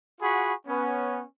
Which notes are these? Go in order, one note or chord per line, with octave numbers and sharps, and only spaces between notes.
F4 F#4 G#4 F#5 B5 C#6
B3 C#4 B4